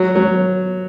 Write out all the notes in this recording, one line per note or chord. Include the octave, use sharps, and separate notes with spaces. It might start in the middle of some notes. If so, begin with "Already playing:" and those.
Already playing: F#3
F#3